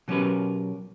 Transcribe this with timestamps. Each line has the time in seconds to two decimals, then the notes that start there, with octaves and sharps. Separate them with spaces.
0.08 B2 F#3 C#4 G4 A#4 B4